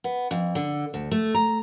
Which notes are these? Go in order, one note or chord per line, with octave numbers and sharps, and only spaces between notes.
B3
F2
D3
D2
A3
A#5